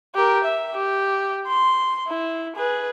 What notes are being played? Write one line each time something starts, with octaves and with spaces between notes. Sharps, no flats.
G4 A#4
E5
G4
C6
E4
G#4 B4